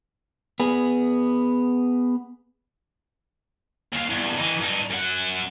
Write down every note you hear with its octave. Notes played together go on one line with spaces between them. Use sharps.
B3 G#4
D#2 F5
E2 G2
E3 D#4
G2 D#4
F#2 F#5